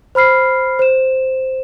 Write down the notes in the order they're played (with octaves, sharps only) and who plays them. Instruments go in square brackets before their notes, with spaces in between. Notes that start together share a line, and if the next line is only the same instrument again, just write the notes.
[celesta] C5 B5 F6 C7
C5 E7